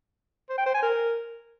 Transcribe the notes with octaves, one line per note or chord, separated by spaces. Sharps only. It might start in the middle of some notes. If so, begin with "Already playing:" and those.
C5
G5
C5
G#5
A#4